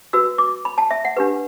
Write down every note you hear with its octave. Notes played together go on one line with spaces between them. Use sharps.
F#4 B4 E6
D6
B5
A5
E5
F#5
D4 G4 B4